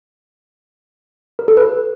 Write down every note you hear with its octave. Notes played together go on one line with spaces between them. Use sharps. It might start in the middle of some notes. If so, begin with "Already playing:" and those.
A#4
A4
B4